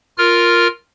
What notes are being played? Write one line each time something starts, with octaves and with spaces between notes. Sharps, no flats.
F4 A#4 F6